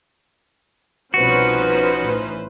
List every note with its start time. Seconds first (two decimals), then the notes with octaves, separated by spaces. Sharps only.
1.14 C2 B2 F3 C#4 D#4 F#4 B4 C5
2.02 A1 E3